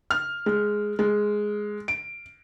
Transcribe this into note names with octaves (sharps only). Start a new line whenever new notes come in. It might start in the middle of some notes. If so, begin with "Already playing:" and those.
F6
G#3
G#3
D7